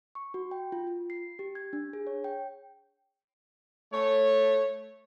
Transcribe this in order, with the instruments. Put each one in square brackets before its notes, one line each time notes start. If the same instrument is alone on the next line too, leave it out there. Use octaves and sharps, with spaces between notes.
[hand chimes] C#6
F#4
G5
F4
F4
C7
G4
G#6
D4
G#4
C#5
G5
[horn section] A3 C#5